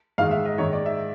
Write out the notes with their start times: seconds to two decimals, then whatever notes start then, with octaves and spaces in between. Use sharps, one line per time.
0.18 G#2 D#3 F5
0.31 E5
0.45 D#5
0.58 G#2 D#3 C#5
0.73 D5
0.86 E5